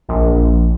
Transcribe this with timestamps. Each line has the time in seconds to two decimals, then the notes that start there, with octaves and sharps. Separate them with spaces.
0.08 A#1